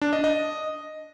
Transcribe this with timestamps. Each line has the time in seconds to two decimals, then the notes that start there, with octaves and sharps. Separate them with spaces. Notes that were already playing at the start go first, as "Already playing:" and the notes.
0.02 D4
0.13 D#5
0.24 D#5